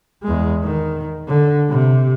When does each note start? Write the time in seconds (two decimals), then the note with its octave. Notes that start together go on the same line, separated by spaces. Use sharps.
0.23 E2 G#3
0.63 D#3
1.28 D3
1.70 C3